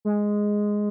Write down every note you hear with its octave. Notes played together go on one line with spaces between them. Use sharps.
G#3